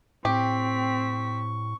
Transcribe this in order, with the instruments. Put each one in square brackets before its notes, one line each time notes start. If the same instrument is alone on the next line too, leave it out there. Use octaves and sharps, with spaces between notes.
[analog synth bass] A2 [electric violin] C4 B6 [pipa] G4 [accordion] C#6